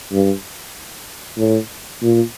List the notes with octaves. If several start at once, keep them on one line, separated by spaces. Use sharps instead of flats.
G2
A2
A#2